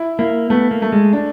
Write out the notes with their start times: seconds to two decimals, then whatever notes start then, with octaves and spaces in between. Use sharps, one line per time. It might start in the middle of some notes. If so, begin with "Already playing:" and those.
Already playing: E4
0.19 A#3 E4
0.50 A3 B3
0.71 A#3
0.82 A3
0.92 G#3
1.13 D4